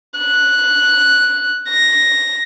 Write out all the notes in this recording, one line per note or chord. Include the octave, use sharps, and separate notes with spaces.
F#6
A#6